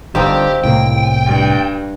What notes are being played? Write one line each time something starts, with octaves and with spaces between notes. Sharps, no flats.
G1 G2 D3 D#3 F3 C4 G4
C2 A2 A#3 G5
G2